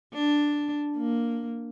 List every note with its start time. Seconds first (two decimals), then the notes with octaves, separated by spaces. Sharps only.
0.14 D4
0.96 A#3